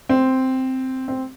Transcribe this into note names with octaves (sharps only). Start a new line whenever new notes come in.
C4
C4